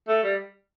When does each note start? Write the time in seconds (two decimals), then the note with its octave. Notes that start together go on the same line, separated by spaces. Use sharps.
0.08 A3
0.23 G3